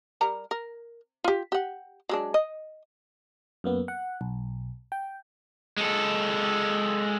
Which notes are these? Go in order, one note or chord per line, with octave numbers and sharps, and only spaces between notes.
G3 A#4 A#5
A#4
F4 G4
G4 F#5
F#3 G#3 D4
D#5
F#2 A#3 B3
F#5
B1
G5
G#3 A4